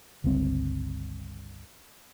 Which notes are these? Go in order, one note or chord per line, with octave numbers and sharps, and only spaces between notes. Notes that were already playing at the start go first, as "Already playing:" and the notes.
G1 C#2 G2 C4